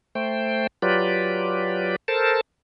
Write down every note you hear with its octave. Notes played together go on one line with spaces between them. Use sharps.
A3 C5 G5
F#3 F4 G4 B4 D5
A4 A#4 C5 A5